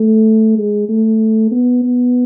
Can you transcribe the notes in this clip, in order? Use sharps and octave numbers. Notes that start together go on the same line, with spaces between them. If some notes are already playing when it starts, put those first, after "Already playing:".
Already playing: A3
G#3
A3
B3
B3